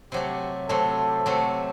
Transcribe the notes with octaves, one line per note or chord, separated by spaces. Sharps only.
C3 F#3 A3 G4
C3 F#3 A3 A4
C3 F#3 A3